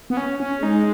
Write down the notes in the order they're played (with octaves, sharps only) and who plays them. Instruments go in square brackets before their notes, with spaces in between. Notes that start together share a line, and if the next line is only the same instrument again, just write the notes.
[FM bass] B3
C#4
C#4
[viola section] G#3 [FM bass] D#4